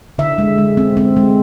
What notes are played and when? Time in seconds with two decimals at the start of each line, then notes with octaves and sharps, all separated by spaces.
0.18 D3 E5
0.38 G#3
0.58 G#3
0.77 C4
0.97 C4
1.17 G#3